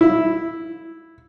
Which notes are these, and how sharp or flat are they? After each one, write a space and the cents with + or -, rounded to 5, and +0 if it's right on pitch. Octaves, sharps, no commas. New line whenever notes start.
E4 -5